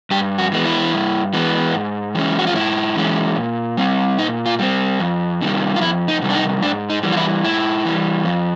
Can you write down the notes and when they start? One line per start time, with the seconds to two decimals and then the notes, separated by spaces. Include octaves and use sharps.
0.11 G2 G4
0.38 F#4
0.52 E3 G#3 B3
0.65 E4
0.92 G2
1.34 E3 G#3 B3
1.74 G#2
2.15 E3 G#3 C#4
2.39 F#4
2.47 F4
2.55 G#2 E4
2.96 E3 G#3 C#4
3.36 A#2
3.77 G3 C4
4.18 A#2 D#4
4.46 F4
4.59 G3 C4
4.99 F2
5.41 C3 D#3 G3
5.76 F4
5.81 F2 E4
6.08 D#4
6.22 C3 D#3 G3
6.30 D4
6.35 D#4
6.63 G#2 D4
6.90 D#4
7.03 E3 G3
7.12 F4
7.17 E4
7.44 G#2 E4
7.85 E3 G3
8.25 F2